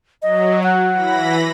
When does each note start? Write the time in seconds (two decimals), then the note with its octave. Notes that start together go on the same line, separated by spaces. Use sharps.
0.23 F#3 D#5
0.63 F#5
0.93 E3 B5 A#6